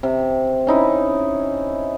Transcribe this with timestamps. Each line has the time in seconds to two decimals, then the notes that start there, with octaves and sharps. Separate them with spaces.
0.03 C3
0.67 C#4 D#4 E4